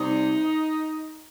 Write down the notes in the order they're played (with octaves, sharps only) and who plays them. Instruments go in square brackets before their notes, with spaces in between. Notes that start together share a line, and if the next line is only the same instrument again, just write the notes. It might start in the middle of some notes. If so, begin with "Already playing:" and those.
Already playing: [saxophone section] C3 G3 D#4